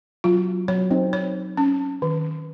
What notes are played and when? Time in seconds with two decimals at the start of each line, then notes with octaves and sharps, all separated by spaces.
0.24 F#3 F4
0.68 F#3 C#5
0.91 C4 D#4
1.13 C#5
1.57 C#4
2.02 D#3